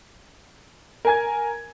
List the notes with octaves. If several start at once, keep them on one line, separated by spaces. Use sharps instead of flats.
A#4 G#5 G#6